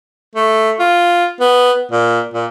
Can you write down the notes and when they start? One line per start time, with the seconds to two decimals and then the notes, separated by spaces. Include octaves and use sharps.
0.36 A3
0.80 F4
1.40 B3
1.92 A#2
2.34 A#2